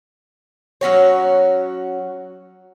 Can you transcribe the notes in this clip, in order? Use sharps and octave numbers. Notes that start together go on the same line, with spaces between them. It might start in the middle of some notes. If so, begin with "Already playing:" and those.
F#3 C#4 F#4 C#5